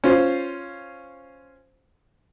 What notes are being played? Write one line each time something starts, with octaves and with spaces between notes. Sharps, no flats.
C#4 F4 C5